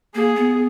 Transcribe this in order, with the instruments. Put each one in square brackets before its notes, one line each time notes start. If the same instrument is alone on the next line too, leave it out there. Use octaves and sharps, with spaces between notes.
[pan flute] A#3 [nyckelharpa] G#4
[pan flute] B3